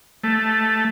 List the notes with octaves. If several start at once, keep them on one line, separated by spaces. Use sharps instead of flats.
A3